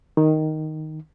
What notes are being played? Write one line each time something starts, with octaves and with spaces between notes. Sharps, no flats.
D#3